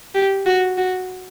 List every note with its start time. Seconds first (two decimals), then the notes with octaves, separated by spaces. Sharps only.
0.15 G4
0.46 F#4
0.78 F#4